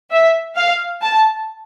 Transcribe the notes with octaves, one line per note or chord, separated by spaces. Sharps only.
E5
F5
A5